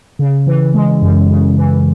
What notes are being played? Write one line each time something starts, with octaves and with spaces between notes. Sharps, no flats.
C#3
E3
G#3
F#2
C#3
E3